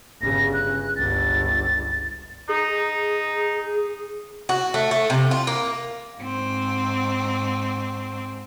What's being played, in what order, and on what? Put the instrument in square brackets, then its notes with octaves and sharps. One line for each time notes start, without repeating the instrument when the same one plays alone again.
[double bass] G1 C#3 [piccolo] A#6
[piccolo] F#6
[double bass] G1 C#2 [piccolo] A6
[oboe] D#4 [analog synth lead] G#4
[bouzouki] F#4
A3
A3
C3
F4
A#3
[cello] G#2 C4